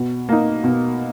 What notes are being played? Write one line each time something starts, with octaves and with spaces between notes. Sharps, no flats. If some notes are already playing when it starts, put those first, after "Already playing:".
Already playing: B2
A#3 D#4
B2